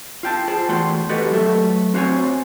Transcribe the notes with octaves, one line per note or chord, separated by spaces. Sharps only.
F4 G5 A5
G#4 C5 A5
E2 A3 F#4 F#5 G5 C6
F#4 G4 A4 B4 D#5 F#5
F#3 A3 A4 E5
C4 F#4 C5 C#5 G#5